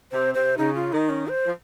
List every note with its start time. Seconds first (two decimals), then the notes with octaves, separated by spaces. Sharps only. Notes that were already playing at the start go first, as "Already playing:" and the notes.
0.12 C3 C5
0.34 C3 C5
0.58 C#3 D#4
0.75 F4
0.92 D#3 D#4
1.09 C#4
1.28 C5
1.46 F3